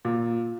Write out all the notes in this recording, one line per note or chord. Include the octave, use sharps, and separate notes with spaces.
A#2